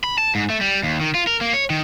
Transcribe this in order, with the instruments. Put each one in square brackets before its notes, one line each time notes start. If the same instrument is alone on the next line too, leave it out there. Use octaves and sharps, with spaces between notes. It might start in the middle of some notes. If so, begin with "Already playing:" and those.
[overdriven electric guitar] B5
A5
G#2
A3
G3
D#2
D#3
F4
A#4
A#3
C#5
D#3